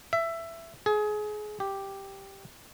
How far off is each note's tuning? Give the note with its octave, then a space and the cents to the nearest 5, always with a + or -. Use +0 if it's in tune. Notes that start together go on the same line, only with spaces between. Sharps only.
E5 +15
G#4 +25
G4 +0